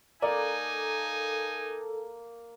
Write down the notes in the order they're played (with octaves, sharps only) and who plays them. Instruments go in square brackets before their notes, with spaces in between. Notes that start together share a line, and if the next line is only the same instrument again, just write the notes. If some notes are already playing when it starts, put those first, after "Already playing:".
[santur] A#3 [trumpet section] D#4 G#5 [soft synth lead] A4 [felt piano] D5